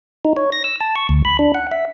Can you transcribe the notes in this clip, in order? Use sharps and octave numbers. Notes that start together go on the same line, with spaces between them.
D#4
C#5
A#6
E6
A5
C#6
D2
B5
D4
F#5
E5